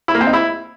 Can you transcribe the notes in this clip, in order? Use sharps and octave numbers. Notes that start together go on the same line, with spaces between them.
E4
A#3
C4
D#4
E4